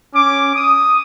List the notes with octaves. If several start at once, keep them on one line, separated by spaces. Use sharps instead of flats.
C#4 D6
D#6